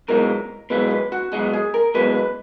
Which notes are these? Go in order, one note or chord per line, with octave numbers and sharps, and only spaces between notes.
B1 B2 G#3 A#4
B1 B2 G#3 B4
B4
F#4
B1 B2 G#3 F#4
G#4
A#4
B1 B2 G#3 B4
B4